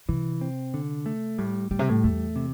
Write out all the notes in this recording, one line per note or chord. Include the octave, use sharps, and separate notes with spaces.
C3 E3
C4
D3
A3
A2 G3
A2 G3
C3
A2
E2 A3
C3